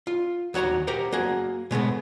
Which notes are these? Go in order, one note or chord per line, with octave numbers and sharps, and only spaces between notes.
F4
D#2 F#4 C#5 F#5 A#5
G4 A#4 C5 F#5
A#3 F#4 G#4
B2 G#3 A3 B3